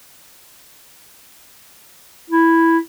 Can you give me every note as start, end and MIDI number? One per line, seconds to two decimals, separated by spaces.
2.30 2.78 64